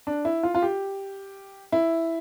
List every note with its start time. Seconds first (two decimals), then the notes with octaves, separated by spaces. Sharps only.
0.07 D4
0.25 E4
0.43 F4
0.55 F4
0.62 G4
1.72 E4